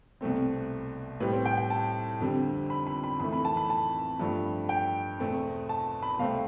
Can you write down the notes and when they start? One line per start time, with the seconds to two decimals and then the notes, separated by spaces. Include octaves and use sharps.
0.21 C2 B2 A3 C4
1.20 A2 G3 C4 B4
1.33 C5
1.46 G5
1.58 G5
1.70 A5
2.20 F2 D3 G3 C4
2.70 B5
2.87 B5
3.04 B5
3.20 F2 E3 A3 B5
3.33 B5
3.45 A5
3.57 B5
3.70 A5
4.20 G2 F3 A3
4.69 G5
5.19 E2 B2 A3 C4
5.69 A5
6.03 B5
6.19 C2 B2 A3 C4 F5